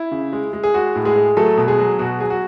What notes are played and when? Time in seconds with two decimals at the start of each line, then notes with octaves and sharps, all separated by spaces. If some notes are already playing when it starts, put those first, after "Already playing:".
Already playing: E4
0.11 C#3
0.33 G#3
0.53 G#3
0.63 G#4
0.74 G#3 F#4
0.95 A2
1.05 G#3 G#4
1.16 G#3
1.37 F#3 A3 A4
1.57 B2
1.68 G#3 G#4
1.79 F#3
1.99 B2 F#4
2.20 F#3 G#4
2.30 F#4